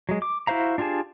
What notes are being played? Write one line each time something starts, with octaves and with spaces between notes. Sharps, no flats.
F#3 G#3
D6
E4 F#4 C5 F5 A#5
D4 F4 G4 G#4 A5